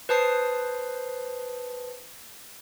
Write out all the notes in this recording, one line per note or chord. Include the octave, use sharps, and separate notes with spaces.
B4 C5 A5 D#6 C7